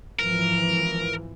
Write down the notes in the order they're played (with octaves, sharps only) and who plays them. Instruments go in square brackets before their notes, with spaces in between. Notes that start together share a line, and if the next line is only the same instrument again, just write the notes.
[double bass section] G#1 E3 F3 [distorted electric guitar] A#4